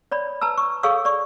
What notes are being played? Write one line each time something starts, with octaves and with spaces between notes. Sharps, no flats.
C#5 D5 B5
B4 A5 A#5 E6
C#6
G#4 A4 C#5 F5 C#6 E6
D5 C#6